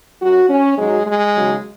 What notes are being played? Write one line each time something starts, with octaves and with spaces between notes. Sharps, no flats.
F#2 F#3 F#4
C#4
G#2 F#3 G#3
G#3
D#2 C#3 F#3